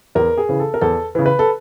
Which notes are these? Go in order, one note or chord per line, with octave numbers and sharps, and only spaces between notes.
E2 A#4
G#4
C#3 E3
A4
A#4
E2 A4
C#3 E3
B4
A4